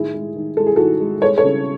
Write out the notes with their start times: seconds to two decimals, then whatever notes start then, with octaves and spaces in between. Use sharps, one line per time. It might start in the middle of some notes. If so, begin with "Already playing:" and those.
Already playing: A2 D#3 E4 G#4
0.14 G#3
0.36 D#3
0.57 G#3 A4
0.67 G#4
0.76 D#3 F#4 A4
1.00 G#3
1.21 G#3 A4 C#5
1.38 A4 C#5
1.43 C#3